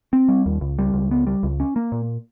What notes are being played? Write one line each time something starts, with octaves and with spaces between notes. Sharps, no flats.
C4
G3
D#2
C#2
G3
C#2
B3
G3
C#2
C#4
A#3
A#2